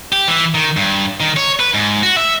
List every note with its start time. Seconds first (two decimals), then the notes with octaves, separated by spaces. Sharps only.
0.12 G4
0.28 E3
0.54 D#3
0.77 G2
1.20 D#3
1.37 C#5
1.60 B4
1.74 G#2
2.03 F#4
2.16 E5